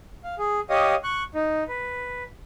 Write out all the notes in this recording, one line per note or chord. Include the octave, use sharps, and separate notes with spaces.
F5
G#4
G4 C#5 D#5 F5 D#6
C#6 F#6
D#4
B4